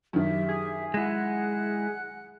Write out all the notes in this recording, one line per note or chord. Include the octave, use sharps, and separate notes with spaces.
F#2 D#3 G4 E5
G#4
G#3 E4 F#5 F#6